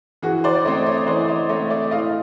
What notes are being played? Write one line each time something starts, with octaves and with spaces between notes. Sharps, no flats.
E3 F#4 G#4
C5 D5
D5
A3 C4 C#5 D#5
C#5 D#5
C#5
E3 C5 D5
C#5 D#5
A3 C4 C#5 D#5
D5 E5
A2 D#5 F5